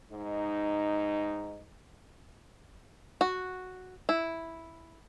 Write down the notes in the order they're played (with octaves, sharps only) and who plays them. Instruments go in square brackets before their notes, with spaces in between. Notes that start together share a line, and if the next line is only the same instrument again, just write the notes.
[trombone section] G#2 D#4
[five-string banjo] F#4
E4